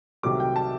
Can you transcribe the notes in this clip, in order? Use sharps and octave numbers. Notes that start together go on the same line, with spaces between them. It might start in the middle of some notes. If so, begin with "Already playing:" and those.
C2 C3 D#3 F#3 A3 D6
G5
A5